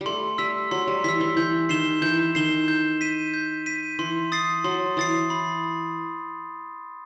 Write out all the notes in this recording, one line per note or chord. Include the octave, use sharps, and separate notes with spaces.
G3
A3 C6
G3 E6 B6
F#3 C6
G3
E3 E6 B6
E3
E3 G6
D#3 C7 E7 G7
E3 G6
D#3 C7 E7 G7
G6
B6 D#7
G6
B6 D#7
E3 C6
D#6 A6 C7
F#3 C6
E3 D#6 A6 C7
B5